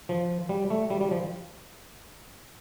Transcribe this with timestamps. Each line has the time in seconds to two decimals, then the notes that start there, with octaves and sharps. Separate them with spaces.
0.09 F3
0.49 G3
0.70 A3
0.90 G3
1.01 G3
1.11 F3